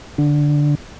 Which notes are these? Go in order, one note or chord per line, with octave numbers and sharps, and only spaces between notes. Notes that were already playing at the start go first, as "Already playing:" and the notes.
D3